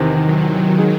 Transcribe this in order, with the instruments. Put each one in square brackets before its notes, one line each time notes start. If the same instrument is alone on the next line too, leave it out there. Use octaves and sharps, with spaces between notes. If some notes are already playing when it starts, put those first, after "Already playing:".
Already playing: [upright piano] E2 C3 E3 C4 [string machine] D#3
[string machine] F#3
[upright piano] G#3 D#4 G#4